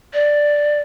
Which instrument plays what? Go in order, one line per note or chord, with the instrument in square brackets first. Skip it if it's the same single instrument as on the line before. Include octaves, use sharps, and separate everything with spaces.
[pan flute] D5